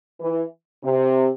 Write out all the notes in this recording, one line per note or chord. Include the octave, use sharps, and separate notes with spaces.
E3
C3